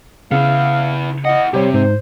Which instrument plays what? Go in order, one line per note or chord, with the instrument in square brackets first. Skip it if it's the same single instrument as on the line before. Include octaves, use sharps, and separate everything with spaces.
[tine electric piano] C#3 [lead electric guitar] B3 E4 [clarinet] F5
[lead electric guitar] E4 F#5 [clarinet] D#5
[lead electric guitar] C3 [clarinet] G3 [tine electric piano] G4 C5 C#5
[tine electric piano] G#2 [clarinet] C5